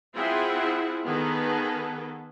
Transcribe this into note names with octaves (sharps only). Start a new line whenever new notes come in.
C4 E4 F4 G#4 E5 F#5
D#3 B3 G#4 A4 B4